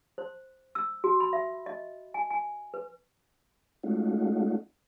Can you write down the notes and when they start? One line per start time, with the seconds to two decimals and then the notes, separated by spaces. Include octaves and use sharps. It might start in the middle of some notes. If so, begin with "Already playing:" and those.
0.18 C5
0.75 E6
1.04 F#4
1.20 B5
1.33 E5
1.66 D#5
2.14 G#5
2.30 G#5
2.74 B4
3.83 G#3 A3 C#4 D#4 F4 F#4